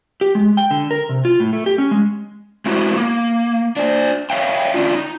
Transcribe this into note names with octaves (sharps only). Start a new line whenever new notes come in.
G4
G#3
G5
D3
A#4
C3
F4
A2
A3
G4
C#4
G#3
G#3 A3 C4 E4 F#4
A#3
D4 C5
C#5 E5 F5 G5
D3 C#4 D4 F4
D#4